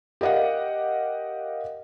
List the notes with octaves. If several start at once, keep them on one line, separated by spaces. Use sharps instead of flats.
G4 A#4 D#5 F5 F#5